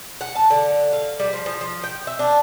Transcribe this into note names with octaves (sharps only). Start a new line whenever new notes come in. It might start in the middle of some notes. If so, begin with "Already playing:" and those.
F#5
A5
D3
F5
G3
F3
F3
F3
G5
E5
D4